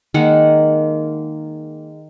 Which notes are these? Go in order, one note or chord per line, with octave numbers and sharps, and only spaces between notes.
D#3 G#3 A#3 F#5